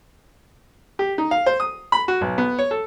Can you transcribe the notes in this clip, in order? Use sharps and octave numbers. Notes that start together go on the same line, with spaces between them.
G4
D#4
F5
C5
D#6
B5
F#4
B1
B3
C#5
A4